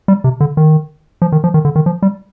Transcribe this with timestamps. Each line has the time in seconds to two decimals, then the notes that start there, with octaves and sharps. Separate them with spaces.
0.08 G3
0.24 C3
0.40 D3
0.57 D#3
1.22 F3
1.32 D#3
1.44 F3
1.54 D#3
1.65 D3
1.76 D#3
1.86 F3
2.02 G3